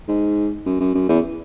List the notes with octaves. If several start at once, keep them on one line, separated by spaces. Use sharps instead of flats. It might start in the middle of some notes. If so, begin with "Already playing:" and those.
G#2
F#2
F#2
F#2
E2